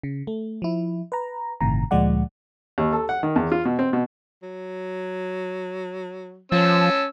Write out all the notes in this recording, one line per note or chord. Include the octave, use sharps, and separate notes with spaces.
C#3
A3
F3 E4
B4 A#5
G1 A2 C3 D#3 A#5
D2 A#2 F3 G#3 D5 F#5
D#2
A4
F#5
D#3
E2
F4
B2
C4
B2
F#3
F3 C#4 A5 E6